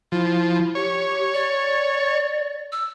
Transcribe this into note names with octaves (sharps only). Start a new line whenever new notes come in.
F3 E4
G4 C#5
D5
E6